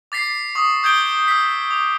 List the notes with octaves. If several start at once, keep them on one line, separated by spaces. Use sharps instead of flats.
D6 A6 B6 C7
C#6 D#6
D#6 G6 G#6 D7 G7
E6 B6
D6